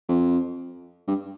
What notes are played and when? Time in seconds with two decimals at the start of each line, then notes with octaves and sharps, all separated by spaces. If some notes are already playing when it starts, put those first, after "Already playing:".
0.08 F2
1.07 G2